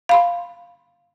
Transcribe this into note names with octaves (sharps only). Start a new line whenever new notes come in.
F5 B5 C6